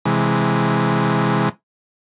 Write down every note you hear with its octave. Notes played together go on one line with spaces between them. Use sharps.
C3 E3 G#3